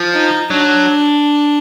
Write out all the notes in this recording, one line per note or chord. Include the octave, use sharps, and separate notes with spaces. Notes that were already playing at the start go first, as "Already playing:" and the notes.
Already playing: F3
D#4
F#3 D4